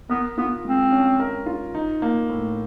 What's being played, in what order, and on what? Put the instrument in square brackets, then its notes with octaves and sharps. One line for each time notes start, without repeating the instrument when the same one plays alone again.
[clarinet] B3 [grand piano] A#4
[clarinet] B3 [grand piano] F4
[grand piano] G#3 [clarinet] C4
[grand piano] C#4
A#4
F4
D#4
A#3
A2